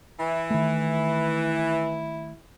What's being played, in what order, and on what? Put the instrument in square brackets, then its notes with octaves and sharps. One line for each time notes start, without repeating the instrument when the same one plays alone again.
[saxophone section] E3 [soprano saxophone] E4
[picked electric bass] D#3 A3